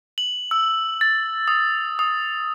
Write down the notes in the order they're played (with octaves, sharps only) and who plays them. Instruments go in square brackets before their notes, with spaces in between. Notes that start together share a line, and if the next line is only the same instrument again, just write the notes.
[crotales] F#7
E6
A6
D#6
D#6